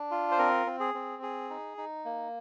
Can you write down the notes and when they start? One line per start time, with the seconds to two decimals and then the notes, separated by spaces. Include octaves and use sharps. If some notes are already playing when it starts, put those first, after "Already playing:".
Already playing: D4
0.11 F4
0.31 C5
0.38 C4 A#4
0.66 C4
0.80 G#4
0.94 C4
1.22 G#4
1.50 D#4
1.77 D#4
2.05 A#3